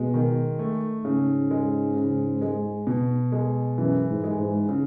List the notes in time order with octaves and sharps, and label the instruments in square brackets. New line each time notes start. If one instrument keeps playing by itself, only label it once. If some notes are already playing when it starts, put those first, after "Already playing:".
Already playing: [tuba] B2 [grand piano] G#3
[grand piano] D#3
A3
[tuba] G#2 [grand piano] C#3
[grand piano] G#3
C#3
G#3
B2
G#3
[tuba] F#2 [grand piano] E3
[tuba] G#2
[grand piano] G#3
[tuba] G#2
[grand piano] C#3